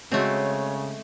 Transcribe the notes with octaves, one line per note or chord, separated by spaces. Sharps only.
C#3 G#3 A3 C4 F#4 C#5